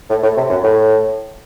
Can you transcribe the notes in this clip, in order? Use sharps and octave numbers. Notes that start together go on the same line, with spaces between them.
A2
A2
C3
F#2
A2